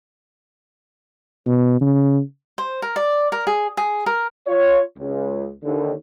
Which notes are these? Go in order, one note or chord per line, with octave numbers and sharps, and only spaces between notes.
B2
C#3
C5
A#4
D5
A#4
G#4
G#4
A#4
F4 C#5
C#2
D#2 D3